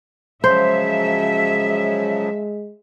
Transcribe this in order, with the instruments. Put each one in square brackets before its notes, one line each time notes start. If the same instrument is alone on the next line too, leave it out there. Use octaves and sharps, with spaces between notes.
[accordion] C#3 F3 F#3 [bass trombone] G#3 [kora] C5 [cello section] E5